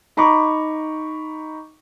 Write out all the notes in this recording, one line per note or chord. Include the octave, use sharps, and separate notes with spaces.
D#4 A#5 B5 C#6 D6